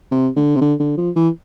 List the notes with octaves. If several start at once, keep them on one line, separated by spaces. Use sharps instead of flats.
C3
D3
C3
D3
D3
F3
E3